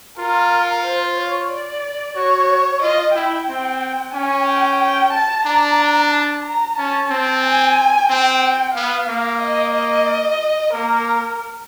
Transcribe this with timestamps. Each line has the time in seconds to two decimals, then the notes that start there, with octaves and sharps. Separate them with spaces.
0.18 F4 A#4
0.85 C5
1.17 C#5
1.51 D5
2.16 F#4 C#5
2.82 F4 D#5
3.15 E4 G5
3.49 C4
4.14 C#4 G#5
4.47 G5
4.80 G5
5.13 A5
5.46 D4 A#5
6.12 A5
6.45 A#5
6.78 C#4 A5
7.10 C4
7.44 G#5
8.10 C4 G5
8.75 B3 F5
9.09 A#3
9.42 D#5
9.74 D#5
10.73 A#3 A#4